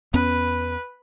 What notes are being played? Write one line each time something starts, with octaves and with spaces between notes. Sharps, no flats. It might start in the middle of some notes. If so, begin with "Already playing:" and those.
E2 B3 C#4 B4